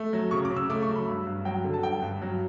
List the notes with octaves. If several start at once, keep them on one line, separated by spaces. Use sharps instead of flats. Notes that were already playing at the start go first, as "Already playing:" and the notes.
Already playing: A3
F#3
C#3 C#6
D6
C#3
E6
A3 D6
C#6
F#3
B5
G2
G2
F#3 G5
D3
A5
G2 G5
G2
F#3